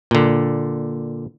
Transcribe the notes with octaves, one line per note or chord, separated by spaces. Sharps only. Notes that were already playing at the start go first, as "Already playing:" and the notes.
A#2 D3